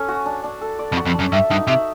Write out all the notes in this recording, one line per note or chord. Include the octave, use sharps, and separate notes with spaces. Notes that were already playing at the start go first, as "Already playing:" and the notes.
Already playing: C#4 A4
F#4
D4
D4
A4
D5
F2
F#4
F2
F#2 D4
G2 E5
G2 D#4
C3 E5